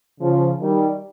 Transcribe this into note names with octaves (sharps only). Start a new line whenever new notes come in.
C#3 F3
D#3 G3